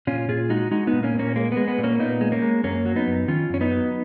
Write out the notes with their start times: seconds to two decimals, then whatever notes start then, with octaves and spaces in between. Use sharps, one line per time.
0.07 A#2 C#4 F4
0.29 A#2 F4 G#4
0.49 G#3 D#4 F#4
0.71 G#3 D#4 F#4
0.87 B3 D#4
0.93 A#2
1.03 A#3 C#4
1.15 A#2 A#3 C#4
1.36 G#3 A#3
1.52 G#3 B3
1.68 B3
1.78 A#2
1.84 A#3 C#4
1.99 A#2 B3 D#4
2.21 G#3
2.32 A#3 C#4
2.42 G#3
2.64 F#2 A#3 C#4
2.85 F#3
2.96 B3 D#4
3.07 F#2
3.28 D#3 C#4 F4
3.50 F#2 C#4
3.61 B3 D#4
3.71 F#3